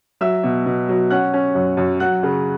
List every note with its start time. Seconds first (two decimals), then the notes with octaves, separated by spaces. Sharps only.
0.21 F#3 E5 E6
0.44 B2
0.66 B2
0.89 F#3
1.10 C#4 F#5 F#6
1.34 C#4
1.55 F#2
1.77 F#2
2.00 F#3 F#5 F#6
2.23 C#3